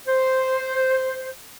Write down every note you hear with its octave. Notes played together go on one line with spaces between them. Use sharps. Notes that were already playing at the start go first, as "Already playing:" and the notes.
C5